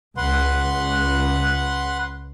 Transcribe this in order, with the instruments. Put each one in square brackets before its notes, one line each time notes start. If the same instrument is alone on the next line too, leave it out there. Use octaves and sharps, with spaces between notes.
[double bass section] C#2 [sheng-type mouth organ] B4 F#5 C6